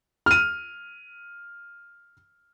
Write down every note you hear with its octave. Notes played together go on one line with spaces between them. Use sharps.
F6 D#7